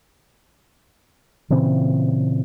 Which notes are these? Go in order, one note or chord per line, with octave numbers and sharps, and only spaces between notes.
A#2 C#3 E3 C4